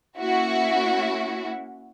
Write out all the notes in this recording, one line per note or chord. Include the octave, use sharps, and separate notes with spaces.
A#3 C#4 E4 F#4